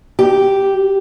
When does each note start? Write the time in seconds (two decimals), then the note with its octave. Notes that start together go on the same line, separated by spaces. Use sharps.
0.19 G4